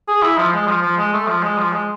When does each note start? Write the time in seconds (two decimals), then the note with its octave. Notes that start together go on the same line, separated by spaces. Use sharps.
0.08 G#4
0.22 E4
0.38 F3
0.53 G#3
0.67 F3
0.82 F3
0.97 G#3
1.13 A3
1.27 F3
1.43 G#3
1.58 F3
1.72 G#3